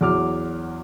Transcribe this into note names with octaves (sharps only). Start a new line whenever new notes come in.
E2 F#3 D6 F6